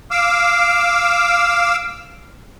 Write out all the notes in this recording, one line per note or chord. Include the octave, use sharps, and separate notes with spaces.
F5 D6 E6